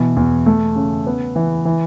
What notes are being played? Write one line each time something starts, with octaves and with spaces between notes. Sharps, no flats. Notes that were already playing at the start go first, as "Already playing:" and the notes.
Already playing: B2 E3
E2
A3
C#3
B3
E3
E3